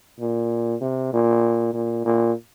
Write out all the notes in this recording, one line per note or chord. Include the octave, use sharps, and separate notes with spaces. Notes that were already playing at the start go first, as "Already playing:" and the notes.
A#2
C3
A#2
A#2
A#2